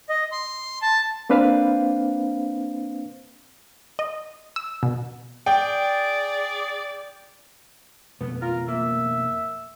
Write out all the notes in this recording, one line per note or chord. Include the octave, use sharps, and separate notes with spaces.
D#5
C6
A5
A#3 C4 D4 B4 C5 F5
D#5
E6
B2
G#4 D5 G5
F2 B2 A3 B3
F4 A#4
A#3 E5